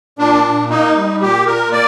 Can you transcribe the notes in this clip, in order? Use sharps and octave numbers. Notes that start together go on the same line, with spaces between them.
A#2 D4
A#2
A#3 D#4
G3
A#2 G4
A#2 A#4
A#3 D5